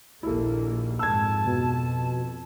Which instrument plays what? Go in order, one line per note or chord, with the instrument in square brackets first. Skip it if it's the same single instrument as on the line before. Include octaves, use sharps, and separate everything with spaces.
[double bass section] A#1 D#2 A#3 [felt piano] E4 A4
[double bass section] F2 G#2 [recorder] A5 [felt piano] E6 G#6
[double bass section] F2 [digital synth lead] B2